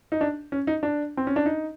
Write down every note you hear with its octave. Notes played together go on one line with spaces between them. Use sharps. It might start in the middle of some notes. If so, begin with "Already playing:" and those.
D#4
D4
C#4
D#4
D4
C4
C#4
D4
D#4